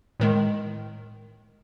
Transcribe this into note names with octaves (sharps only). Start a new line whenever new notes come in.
A2 D#3 G#3